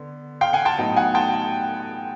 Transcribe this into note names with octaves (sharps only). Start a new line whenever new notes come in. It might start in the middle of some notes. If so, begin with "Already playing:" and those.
Already playing: D3 B3
F5 G5
F#5 G#5
G5 A5
A2 F#3 B3 D#4
F#5 G#5
G5 A5